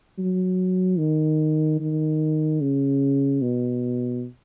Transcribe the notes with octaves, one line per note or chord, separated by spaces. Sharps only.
F#3
D#3
D#3
C#3
B2